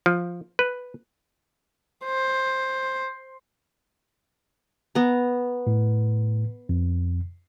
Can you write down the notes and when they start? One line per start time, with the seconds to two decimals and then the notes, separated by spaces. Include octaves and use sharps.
0.06 F3
0.59 B4
2.05 C5
4.95 B3 A#5
5.67 A2
6.69 F2